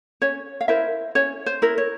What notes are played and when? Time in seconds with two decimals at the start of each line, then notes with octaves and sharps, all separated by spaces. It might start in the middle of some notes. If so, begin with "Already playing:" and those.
0.22 C#4 C#5
0.61 F5
0.68 E4 A#4 C5 E5
1.15 C#4 C#5
1.46 C5
1.62 E4 A#4
1.78 C#5